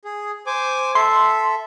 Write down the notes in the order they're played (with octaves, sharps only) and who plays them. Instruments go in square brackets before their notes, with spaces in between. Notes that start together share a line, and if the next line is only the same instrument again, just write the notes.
[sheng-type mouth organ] G#4
C5 G#5 D6
[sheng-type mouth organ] A4 E5 [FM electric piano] C6